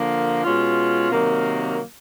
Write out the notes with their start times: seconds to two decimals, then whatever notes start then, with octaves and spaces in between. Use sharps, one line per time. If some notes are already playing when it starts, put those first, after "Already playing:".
Already playing: D3 F3 A#3
0.43 B2 G#3 C#4 F4
1.11 C3 D#3 F#3 A#3